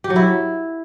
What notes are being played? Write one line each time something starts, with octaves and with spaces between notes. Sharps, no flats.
G4
F#3
E4